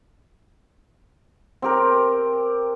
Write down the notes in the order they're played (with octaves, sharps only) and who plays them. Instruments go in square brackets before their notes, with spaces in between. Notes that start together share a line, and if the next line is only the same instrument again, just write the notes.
[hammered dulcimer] C4 G4 A#4